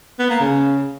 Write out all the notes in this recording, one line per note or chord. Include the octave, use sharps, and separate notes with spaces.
B3
A#3
C#3